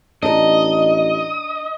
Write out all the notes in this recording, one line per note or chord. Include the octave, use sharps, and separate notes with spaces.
A1 D4 D#4 D#5